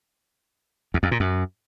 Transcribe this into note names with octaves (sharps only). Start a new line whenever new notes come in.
E2
F2
A#2
F#2